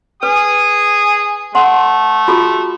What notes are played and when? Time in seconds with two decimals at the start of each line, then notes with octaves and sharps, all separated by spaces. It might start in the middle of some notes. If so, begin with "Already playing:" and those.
0.23 G#4 B4 G#5 D#6
1.55 A3 F#5 C6
2.28 F4 F#4 G#4